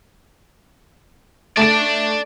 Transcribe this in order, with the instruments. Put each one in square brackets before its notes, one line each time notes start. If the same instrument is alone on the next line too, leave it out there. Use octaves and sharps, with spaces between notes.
[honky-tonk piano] A3 A6 D7 [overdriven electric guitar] D5 A5